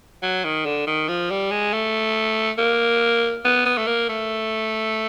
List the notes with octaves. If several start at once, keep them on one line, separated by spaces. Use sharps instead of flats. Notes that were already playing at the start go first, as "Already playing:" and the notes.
F#3
D#3
D3
D#3
F3
G3
G#3
A3
A#3
B3
B3
A3
A#3
A3